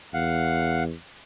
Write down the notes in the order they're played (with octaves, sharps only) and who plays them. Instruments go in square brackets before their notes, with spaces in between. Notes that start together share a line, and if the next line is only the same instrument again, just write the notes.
[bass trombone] E2 [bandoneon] F5 F#5